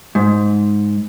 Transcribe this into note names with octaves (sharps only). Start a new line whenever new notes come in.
G#2